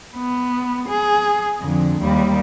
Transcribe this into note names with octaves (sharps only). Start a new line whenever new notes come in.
B3
G#4
F2 D3
D#2 G3